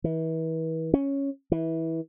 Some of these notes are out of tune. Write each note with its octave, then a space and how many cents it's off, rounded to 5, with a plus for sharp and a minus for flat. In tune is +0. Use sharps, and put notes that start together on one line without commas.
E3 -35
C#4 +0
E3 -20